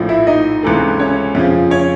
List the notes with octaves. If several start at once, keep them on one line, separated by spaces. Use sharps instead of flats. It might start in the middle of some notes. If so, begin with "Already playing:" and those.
Already playing: A#1 A2 F3
E4 E5
D#4 D#5
C#2 C3 E3 A3
C#4 C#5
F2 C#3 F3
C#4 C#5